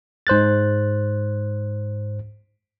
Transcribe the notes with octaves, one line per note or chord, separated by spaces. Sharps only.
G#2 C5 F#6 A6